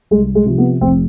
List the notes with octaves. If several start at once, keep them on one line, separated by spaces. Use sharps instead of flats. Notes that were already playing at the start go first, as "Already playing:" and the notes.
C2 G#3
G#3
C3 F3
B3
F1 C4